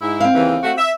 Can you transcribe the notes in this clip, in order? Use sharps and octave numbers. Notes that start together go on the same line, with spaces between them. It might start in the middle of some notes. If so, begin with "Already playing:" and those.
G#2 E4
C4 F5
D#2 C#3 E3
A3 F#4
E5